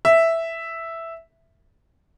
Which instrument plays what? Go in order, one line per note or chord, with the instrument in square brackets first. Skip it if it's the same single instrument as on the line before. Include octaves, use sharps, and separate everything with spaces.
[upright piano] E5